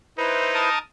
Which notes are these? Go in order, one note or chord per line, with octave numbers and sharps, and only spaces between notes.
D#4 E4 B4 C5
A#4 A5 D#6